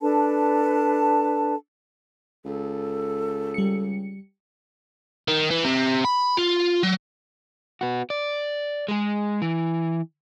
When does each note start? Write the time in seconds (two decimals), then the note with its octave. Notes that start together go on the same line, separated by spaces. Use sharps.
0.01 D4 A4 B4 A5
2.45 C#2 A4
3.54 G3 C#7
5.28 D#3
5.50 E3
5.64 C3
6.05 B5
6.38 F4
6.83 F#3
7.81 B3 F#4
8.10 D5
8.88 G#3 G#4
9.42 E3